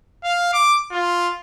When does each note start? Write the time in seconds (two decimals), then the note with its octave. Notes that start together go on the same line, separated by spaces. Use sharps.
0.24 F5
0.53 D6
0.91 F4